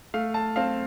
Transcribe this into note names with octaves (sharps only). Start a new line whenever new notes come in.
A3 F5
A5
C4 F5